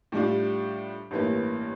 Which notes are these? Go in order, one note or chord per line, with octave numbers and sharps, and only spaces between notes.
A2 G3 D4 F4
A1 G2 E3 A#3